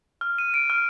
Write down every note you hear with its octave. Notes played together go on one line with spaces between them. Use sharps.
F6
D#7
D7
F6